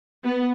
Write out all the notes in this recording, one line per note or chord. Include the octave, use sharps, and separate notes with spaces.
B3